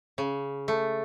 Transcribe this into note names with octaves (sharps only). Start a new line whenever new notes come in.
C#3
A3